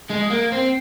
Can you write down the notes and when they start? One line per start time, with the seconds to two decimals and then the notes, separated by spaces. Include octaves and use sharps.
0.10 G#3
0.30 A#3
0.52 C4